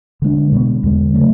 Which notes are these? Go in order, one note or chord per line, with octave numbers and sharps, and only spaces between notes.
D3 G#3 D4
B2 G#3 B3
E2 D3 G#3
C#3 F#3 A3